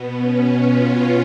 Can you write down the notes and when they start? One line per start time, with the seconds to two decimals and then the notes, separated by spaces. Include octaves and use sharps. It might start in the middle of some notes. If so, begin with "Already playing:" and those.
Already playing: B2 B3
0.19 C#4
0.65 F4